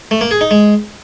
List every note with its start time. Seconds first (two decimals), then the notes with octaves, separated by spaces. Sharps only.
0.11 A3
0.21 A#3
0.31 G#4
0.41 D#4
0.51 G#3